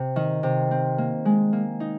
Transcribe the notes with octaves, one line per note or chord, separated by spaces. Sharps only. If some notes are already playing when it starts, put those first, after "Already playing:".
Already playing: C3
D#3
C3
C4
A#3
G#3
A#3
D#4